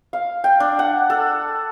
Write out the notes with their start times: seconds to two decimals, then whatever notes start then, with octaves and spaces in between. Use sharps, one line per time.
0.13 F5
0.44 G5
0.60 D4
0.79 F#5
1.10 A4